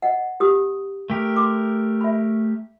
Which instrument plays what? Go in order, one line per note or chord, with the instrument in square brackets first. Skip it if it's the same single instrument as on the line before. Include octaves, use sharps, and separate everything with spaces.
[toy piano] D#5 F#5
G4 D#6
[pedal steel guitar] A3 G4 A#4
[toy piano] C6 D6
E5 B5